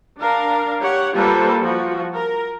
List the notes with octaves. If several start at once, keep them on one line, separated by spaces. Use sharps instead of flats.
D4 A#4 F5
G4 C#5 F#5
G3 A#3 F4 A4 B4 C5
F3 F#4
A#4